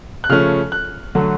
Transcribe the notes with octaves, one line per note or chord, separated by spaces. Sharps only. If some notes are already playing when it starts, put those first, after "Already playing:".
F#6
C#3 F3 A3 C#4 F6
F#6
D3 F#3 A3